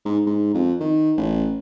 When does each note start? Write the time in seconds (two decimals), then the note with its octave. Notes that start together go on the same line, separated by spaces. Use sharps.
0.05 G#2
0.27 G#2
0.54 F2
0.80 D#3
1.17 A1